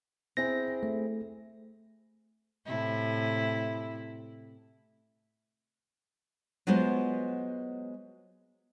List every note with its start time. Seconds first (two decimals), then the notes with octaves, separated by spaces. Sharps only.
0.37 C4 E4 G#4 A#6
0.83 A3
2.66 A2 C3 E4
6.67 F#3 G#3 B3 F4 B4 C5